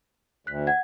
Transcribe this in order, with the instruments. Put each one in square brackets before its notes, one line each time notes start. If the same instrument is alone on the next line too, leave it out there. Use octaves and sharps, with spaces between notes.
[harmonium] D2 [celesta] F#6 B6
[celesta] F#5 G#6